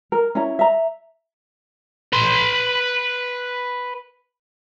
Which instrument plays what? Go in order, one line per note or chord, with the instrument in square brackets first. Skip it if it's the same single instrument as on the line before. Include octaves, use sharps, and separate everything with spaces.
[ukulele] A#4
C#4 E4 A#5
E5 A#5
[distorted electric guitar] B4 C6